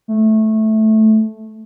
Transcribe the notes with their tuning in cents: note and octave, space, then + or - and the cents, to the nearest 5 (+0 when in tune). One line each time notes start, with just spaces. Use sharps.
A3 -10